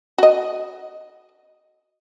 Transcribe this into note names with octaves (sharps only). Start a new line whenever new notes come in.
F#4 D#5